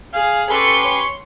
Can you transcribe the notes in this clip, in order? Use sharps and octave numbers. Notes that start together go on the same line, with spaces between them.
G#4 F5
C#4 G4 A4 B4 C6 C#6
C#5